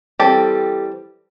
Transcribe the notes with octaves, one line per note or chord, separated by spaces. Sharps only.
E3 G3 C4 G4 A4